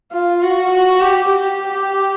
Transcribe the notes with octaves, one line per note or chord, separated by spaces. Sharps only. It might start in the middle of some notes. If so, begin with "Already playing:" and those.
F4
F#4
F#4
G4
G4